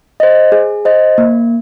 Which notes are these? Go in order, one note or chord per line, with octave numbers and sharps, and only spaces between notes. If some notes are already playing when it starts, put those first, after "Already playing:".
C5 D#5
G#4
C5 D#5
A#3